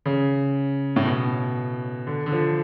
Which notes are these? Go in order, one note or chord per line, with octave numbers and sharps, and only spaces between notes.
C#3
A2
B2
D3
D3
F3